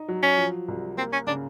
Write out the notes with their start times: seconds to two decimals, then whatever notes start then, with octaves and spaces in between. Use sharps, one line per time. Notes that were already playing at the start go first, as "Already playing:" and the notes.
Already playing: D#4
0.08 F#3
0.23 C#4
0.37 F3
0.68 C2
0.97 A#3 C4
1.13 C#4
1.27 C#3 D4